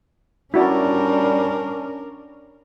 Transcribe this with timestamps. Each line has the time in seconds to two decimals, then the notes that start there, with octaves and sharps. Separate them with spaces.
0.54 G3 C#4 D4 E4 F#4 A#4 D5